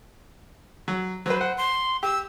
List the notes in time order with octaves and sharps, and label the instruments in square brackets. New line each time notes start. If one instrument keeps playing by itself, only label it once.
[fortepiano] F#3
[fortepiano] F#3 B4 [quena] C5
[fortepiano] F#5
[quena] C6
[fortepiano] G4 [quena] E6